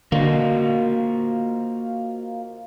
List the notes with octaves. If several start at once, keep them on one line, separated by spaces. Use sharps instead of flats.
D3 A#3 F4 F#4 C5 D#5